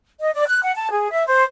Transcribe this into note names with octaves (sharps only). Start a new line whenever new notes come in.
D#5
D5
F#6
F#5
A5
G#4
E5
C5